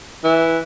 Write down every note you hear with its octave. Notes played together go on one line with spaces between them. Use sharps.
E3